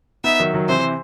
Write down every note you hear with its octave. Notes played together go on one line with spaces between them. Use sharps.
B3 D#4 E5
D#3 F#3
D#3 F#3
C3 E3 C5